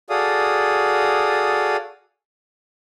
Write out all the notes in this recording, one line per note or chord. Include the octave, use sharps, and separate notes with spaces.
F#4 G#4 A4 D5 F5 D#6